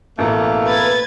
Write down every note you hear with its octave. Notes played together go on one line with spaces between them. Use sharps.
A1 B2 A3 A#3
B4 G#6 A6